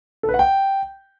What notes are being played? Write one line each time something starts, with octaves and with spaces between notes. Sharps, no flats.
A4
B4
F#5
G5